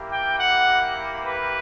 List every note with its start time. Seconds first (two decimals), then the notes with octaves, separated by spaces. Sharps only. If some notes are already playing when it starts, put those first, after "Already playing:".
Already playing: A#3 E4 G4
0.11 G5
0.39 F#5
1.24 B4